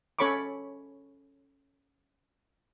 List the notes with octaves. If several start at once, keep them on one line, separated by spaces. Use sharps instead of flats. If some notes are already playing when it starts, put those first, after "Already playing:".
C#4 A4 C#5 B5 C#6 D6